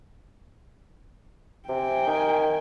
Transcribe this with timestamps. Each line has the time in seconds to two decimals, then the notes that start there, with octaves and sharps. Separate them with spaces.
1.69 C3 G5 G#5
2.07 D#3